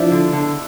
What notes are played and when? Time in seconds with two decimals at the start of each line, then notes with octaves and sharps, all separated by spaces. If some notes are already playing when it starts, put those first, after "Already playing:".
Already playing: F3 D4 E4
0.12 D3
0.33 D3